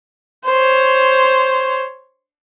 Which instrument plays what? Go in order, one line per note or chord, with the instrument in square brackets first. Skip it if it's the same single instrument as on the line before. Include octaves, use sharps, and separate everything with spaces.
[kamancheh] C5 C#5